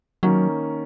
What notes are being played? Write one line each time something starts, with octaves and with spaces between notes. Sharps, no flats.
D#3 F#3 A#3 C#4